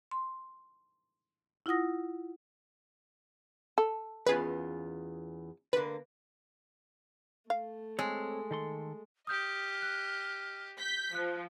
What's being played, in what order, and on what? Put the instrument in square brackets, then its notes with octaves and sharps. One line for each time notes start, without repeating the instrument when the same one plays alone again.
[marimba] C6
E4 F4 F#5 D#6 A#6
[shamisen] A4
[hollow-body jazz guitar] E2 C#4 F4 [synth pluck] G#4 B4
[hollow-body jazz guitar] D3 A#3 [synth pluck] B4
[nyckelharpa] A3 [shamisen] F5
[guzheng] G#3 [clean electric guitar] C4 A4 C#5
[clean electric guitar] D#3 A4 C6
[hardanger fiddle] G4 D#5 [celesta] D#6 G6 [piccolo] F6
[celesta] F#6
[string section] G6 B6
[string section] F3 [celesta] F#6